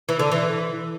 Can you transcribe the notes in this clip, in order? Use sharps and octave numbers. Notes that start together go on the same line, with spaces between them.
E3
D3
E3